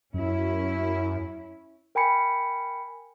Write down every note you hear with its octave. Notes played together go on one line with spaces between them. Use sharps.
F#2 C#4 E4
A#4 G5 G#5 B5 C#7